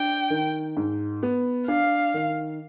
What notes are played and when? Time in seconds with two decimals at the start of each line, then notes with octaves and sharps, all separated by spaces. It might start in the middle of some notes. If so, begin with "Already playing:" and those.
Already playing: D4 G5
0.30 D#3
0.77 G#2
1.23 B3
1.68 D4 F5
2.14 D#3